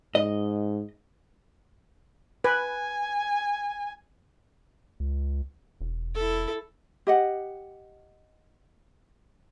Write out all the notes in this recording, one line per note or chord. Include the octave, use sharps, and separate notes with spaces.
G#2 D#5
B4 G#5
C#2
E1
E4 A4
G4 D#5 F#5